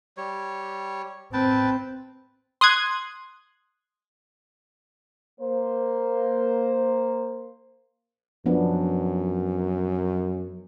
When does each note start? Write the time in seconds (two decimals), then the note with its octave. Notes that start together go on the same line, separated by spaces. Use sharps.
0.17 G3 C#5
1.33 C4 B4 G5 A5
2.61 C6 D#6 F#6 G#6
5.40 A#3 C5
8.46 F#2 F3 B3 D4